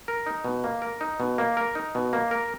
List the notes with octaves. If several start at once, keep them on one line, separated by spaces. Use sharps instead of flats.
A#4
D#4
B2
A#3
A#4
D#4
B2
A#3
A#4
D#4
B2
A#3
A#4